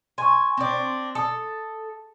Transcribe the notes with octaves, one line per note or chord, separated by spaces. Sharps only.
G#5 C6 C#6
C4 D4
A4 D#6